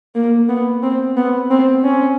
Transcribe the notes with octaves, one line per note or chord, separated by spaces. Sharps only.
A#3
B3
C4
B3
C4
C#4